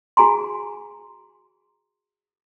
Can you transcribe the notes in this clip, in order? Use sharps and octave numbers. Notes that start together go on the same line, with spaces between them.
F#4 G#4 G#5 A#5 C6